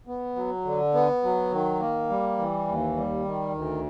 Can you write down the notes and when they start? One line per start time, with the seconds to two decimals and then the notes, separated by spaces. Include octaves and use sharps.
0.07 B3
0.36 F#3
0.65 D3
0.94 B3
1.23 F#3
1.52 D#3
1.80 A#3
2.10 G3
2.38 E3
2.67 D#2
2.96 G3
3.25 D#3
3.54 D2